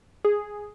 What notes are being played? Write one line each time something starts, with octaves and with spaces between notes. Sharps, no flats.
G#4